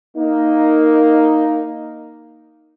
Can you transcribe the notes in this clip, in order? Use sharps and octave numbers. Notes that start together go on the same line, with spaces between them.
A#3 D#4